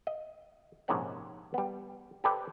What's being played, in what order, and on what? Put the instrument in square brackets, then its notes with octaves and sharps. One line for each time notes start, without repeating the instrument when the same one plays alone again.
[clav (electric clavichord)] D#5
A#1 G#2 C3 G#3 C#4 F#5
G3 B3
G4 A4 B4 C5 D5 G5